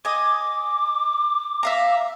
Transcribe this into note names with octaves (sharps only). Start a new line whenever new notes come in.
D#5 G#5 D6
E5 F5 A#5